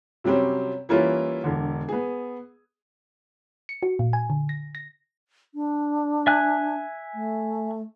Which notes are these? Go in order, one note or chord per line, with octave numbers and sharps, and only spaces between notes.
C3 F#3 G3 C4 C#4
E3 G3 A#3 C#4 E4 F4
E1 D3
B3 G#4
C#7
F#4
A#2
G#5
D3
A#6
A#6
D4
E5 G#5 F#6
A3